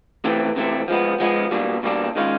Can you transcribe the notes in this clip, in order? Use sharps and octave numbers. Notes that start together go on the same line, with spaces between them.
C3 E3 A3 C4
C3 E3 A3 C4
F3 G#3 B3
F3 G#3 B3
B2 G3 A#3 D4
B2 G3 A#3 D4
D#3 G#3 C#4 F4